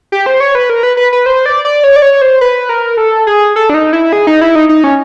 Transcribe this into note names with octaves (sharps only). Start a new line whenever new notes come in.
G4
C5
C#5
B4
A#4
B4
B4
B4
C5
D5
D5
C#5
D5
C#5
C5
B4
A#4
A4
G#4
A4
D4
D#4
E4
G#4
D#4
E4
D#4
D#4
C#4